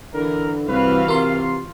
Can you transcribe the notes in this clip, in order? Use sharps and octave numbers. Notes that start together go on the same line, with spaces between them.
D3 E3 A#4
C2 E3 F#4 B4 F5
C3 F4 A#4 C6 C7